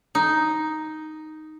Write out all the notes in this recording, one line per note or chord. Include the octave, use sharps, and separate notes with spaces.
D#4